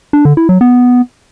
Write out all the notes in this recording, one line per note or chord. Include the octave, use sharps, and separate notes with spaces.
D4
D3
E4
F#3
B3